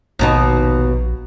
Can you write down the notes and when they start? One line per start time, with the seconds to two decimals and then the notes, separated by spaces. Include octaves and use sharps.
0.19 A#1 D#2 B2 D#4